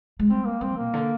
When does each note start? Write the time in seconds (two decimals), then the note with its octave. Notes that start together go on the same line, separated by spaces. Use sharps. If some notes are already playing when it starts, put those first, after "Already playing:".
0.19 G#3
0.30 G3 C4
0.45 A#3
0.61 G3 C4
0.77 A#2 A#3
0.94 D3